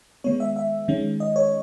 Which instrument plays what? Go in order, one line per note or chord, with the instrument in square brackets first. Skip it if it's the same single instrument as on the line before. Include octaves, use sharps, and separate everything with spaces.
[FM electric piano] D#3 G#3 B3 C#5
E5
E5
D#3 G#3 C#4
D#5
C#5